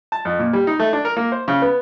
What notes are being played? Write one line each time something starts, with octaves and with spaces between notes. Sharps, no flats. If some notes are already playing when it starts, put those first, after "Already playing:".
A5
F2
A#2
G3
D#4
A3
D4
A#4
A#3
C5
C#3
B3